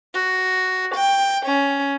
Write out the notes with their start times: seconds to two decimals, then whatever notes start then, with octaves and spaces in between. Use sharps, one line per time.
0.13 F#4
0.95 G5
1.46 C#4